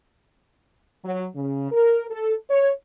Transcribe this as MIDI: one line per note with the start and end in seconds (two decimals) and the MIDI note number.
1.04 1.26 54
1.35 1.70 49
1.71 2.06 70
2.10 2.34 69
2.50 2.71 73